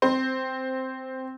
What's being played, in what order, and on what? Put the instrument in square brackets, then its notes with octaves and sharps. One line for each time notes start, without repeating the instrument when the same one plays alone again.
[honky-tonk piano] C4